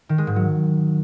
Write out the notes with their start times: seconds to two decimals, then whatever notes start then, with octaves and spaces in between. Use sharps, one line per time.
0.09 D#3
0.18 G#3
0.27 G#2
0.36 F#3